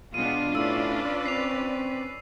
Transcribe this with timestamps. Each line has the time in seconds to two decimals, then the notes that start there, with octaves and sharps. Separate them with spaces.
0.14 B2 G#3 B3 D4 F4 D#7
0.55 A2 C#4 B4 D5 E6
1.26 C4 C7 F7